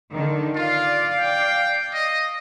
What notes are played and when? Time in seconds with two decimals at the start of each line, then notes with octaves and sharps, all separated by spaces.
0.13 D3 D#3
0.55 F4 D5 F5
1.19 G5
1.93 D#5